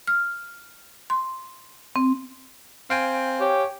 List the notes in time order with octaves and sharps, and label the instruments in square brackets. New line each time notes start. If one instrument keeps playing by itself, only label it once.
[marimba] F6
C6
C4
[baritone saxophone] C4 [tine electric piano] F5 G5 G#5
[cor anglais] G4 [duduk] C#5